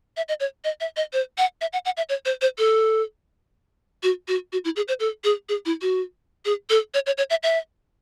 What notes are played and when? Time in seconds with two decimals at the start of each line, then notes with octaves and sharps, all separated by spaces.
0.17 E5
0.29 D#5
0.40 C#5
0.64 D#5
0.81 E5
0.97 D#5
1.13 C5
1.38 F#5
1.61 E5
1.73 F#5
1.85 F#5
1.97 E5
2.09 C#5
2.25 C5
2.42 C5
2.58 A4
4.03 F#4
4.28 F#4
4.53 F#4
4.65 E4
4.76 G#4
4.88 C5
5.00 A4
5.24 G#4
5.49 G#4
5.66 E4
5.82 F#4
6.45 G#4
6.70 A4
6.94 C#5
7.06 C#5
7.18 C#5
7.30 E5
7.43 E5